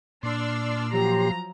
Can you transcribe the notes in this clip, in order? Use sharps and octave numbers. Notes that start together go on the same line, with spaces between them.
A#2 D4 D5 C6 E6 F6
F3 F#3 G4 A#5